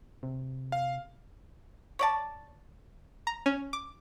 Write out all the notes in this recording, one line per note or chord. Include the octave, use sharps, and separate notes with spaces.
C3
F5
C#5 D5 A5
A#5
C#4
D6